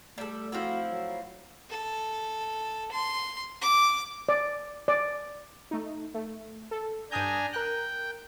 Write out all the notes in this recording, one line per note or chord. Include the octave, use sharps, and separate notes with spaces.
G3 A3 A4
F3 C4 E4 F#4
F#3
A4
C6
D6
D5
D5
A3 D#4
A3
A4
G2 D4 G#5 A#5 D#6 G6
A#4 G5 F#6